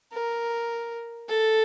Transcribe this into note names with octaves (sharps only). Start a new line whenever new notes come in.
A#4
A4